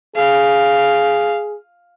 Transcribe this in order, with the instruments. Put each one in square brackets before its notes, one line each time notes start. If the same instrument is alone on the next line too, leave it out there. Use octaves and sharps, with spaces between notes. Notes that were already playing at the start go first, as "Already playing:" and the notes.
[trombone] G#4 [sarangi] F5